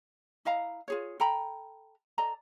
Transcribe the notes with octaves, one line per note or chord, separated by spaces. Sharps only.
E4 D#5 F5 A#5
F4 G#4 C#5
A4 G5 A#5 B5
A4 D5 D#5 A#5